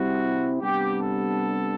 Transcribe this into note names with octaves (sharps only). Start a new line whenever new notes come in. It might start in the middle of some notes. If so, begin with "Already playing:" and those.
Already playing: C3 G3 C4 E4 F#4
C3 G3 B3 D4 G4
A4